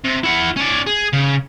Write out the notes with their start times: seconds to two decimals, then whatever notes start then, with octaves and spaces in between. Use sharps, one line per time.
0.05 C3
0.24 E4 F#5
0.57 C#4 D5
0.87 G#4
1.13 C#3